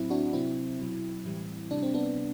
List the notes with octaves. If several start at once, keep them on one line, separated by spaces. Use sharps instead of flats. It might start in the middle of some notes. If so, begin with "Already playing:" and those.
Already playing: A2 F#3 C4 E4
D4 F#4
C3 F#3 C4 E4
B2 F#3
A2 E3 G3
C3 G3 D4
C4
B3 D4
C3 G3